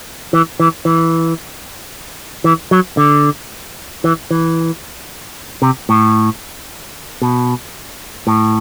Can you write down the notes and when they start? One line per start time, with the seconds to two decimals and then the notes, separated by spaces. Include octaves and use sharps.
0.33 E3
0.60 E3
0.85 E3
2.44 E3
2.71 F#3
2.97 D3
4.04 E3
4.31 E3
5.62 C3
5.89 A2
7.22 B2
8.27 A2